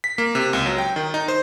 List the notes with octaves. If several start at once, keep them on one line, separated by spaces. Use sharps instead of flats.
B6
A#3
C3
C#2
F#3
G5
D#3
D#4
C5